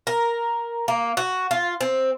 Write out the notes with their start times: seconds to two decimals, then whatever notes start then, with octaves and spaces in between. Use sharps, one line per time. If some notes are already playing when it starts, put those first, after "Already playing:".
0.07 A#4
0.88 A#3
1.17 F#4
1.51 F4
1.81 C4